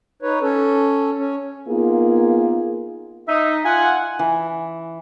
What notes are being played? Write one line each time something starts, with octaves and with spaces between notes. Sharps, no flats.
D#4 B4 C#5
C#4 A4
C#4
A#3 B3 D#4 F4 G#4
D#4 E5
F4 F#5 G#5
E3